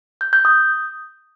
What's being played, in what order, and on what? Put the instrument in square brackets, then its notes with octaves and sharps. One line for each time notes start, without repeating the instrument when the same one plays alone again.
[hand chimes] G6
G6
D#6